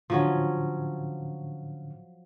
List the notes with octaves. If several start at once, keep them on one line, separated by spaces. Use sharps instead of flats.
A2 D3 F3 F#3 C#4